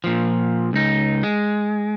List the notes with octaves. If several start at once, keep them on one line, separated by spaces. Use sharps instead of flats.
A#2 F3
C#2 D#4
G#3